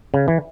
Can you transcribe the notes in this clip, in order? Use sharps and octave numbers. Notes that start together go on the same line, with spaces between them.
C#3
E3